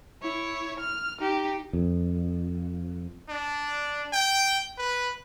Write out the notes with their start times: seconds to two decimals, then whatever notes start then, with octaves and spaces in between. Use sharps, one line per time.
0.22 E4 C#5
0.80 F6
1.19 D#4 G4
1.73 F2
3.29 D4
4.13 G5
4.78 B4